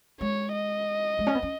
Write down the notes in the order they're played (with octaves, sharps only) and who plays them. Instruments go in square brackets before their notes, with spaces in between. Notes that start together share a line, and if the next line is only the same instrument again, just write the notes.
[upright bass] G#3 [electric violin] C#5
[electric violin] D#5
[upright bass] G#3
C#4
B3
C#4